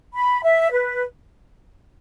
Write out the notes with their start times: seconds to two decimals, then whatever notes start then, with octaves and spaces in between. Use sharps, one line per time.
0.15 B5
0.43 E5
0.71 B4